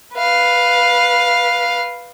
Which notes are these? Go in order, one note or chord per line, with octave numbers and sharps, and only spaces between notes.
B4 F5